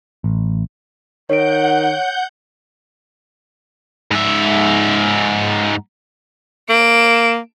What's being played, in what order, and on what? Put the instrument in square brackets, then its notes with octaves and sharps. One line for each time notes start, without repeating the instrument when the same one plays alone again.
[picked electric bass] A1
[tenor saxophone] D#3 [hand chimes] C#5 D7 [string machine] F#5 G6
[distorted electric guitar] G#2 E5
[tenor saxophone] A#3 [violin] D7 E7